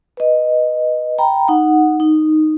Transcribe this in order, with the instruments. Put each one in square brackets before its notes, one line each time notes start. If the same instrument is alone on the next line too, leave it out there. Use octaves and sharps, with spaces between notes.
[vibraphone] B4 D#5
G5 A#5 B5
D#4 F#5
D#4